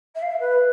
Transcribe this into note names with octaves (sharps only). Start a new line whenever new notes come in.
E5
F5
E5
B4